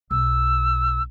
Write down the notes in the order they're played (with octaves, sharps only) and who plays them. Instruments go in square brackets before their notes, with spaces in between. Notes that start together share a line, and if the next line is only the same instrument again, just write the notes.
[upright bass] B1 [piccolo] E6